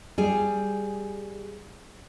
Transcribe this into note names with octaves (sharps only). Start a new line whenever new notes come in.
G3 G#4